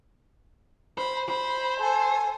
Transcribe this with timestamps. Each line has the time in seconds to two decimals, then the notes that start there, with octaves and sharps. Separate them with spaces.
0.98 C5 B5
1.29 C5 B5
1.80 A4 G#5